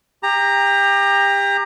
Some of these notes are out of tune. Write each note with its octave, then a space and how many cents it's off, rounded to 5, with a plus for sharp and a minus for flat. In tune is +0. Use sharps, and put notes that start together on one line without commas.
G4 +30 A#5 +0